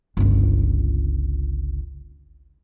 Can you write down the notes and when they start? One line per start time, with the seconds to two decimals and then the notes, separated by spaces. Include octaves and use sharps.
0.17 G1 C#2